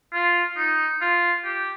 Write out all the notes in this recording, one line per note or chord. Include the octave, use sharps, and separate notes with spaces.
F4
D#4
F4
G4